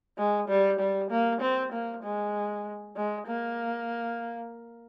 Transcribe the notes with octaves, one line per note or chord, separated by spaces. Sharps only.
G#3
G3
G3
A#3
C4
A#3
G#3
G#3
A#3